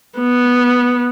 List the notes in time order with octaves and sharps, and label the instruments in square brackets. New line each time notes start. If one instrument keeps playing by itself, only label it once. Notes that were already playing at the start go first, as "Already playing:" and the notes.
[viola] B3